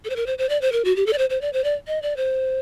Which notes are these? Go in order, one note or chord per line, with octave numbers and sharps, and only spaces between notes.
A4
C5
A#4
C5
C5
D5
C5
A#4
F#4
G4
A4
D5
C5
C5
D5
C5
D5
D#5
D5
C5